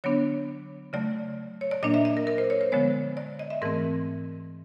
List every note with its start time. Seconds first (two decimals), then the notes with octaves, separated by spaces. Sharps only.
0.04 D3 F#3 B3 D4 C#5
0.93 C#3 F#3 A3 D5
1.61 C#5
1.71 D5
1.83 A#2 F#3 A#3 D4 D#5
1.94 E5
2.05 D#5
2.17 A#4
2.27 A#4
2.38 C5
2.50 C#5
2.61 C5
2.72 D3 F3 G#3 B3 C#5
3.17 D5
3.39 D#5
3.50 E5
3.62 G#2 E3 A3 C4 A#4